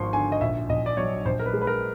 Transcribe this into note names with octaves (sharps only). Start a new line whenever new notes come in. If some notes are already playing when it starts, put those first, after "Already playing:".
Already playing: G#1 F3 C6 C#6
D3 G#5
D#5
A#1 E5
A#1 D#5
D5
F#3 C#5
A#1 C5
A#4
B4
G#3
B4
A#4